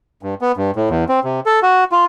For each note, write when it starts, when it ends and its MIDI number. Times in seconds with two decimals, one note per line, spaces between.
0.23 0.35 43
0.41 0.52 59
0.57 0.71 43
0.76 0.89 45
0.90 1.04 40
1.09 1.20 60
1.24 1.40 48
1.46 1.60 69
1.63 1.84 66
1.92 2.05 65